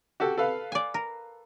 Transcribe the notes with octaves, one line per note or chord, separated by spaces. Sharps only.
F#4 G4 A4
A4 B4 F5
D5 G#5
A#4